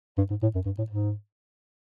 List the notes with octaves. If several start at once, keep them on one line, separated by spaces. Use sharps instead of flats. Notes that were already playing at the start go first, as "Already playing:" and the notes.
G2
G#2
A2
F#2
G2
A2
G#2